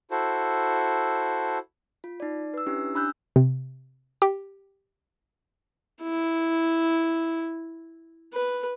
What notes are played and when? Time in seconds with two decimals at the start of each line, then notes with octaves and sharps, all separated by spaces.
0.11 E4 F#4 A4 C5
2.04 F4
2.20 D#4 D5
2.54 B4 E6
2.66 C#4 D4 E4 G4
2.95 D4 B5 E6 F#6 G6
3.36 C3
4.22 G4
6.02 E4
8.33 B4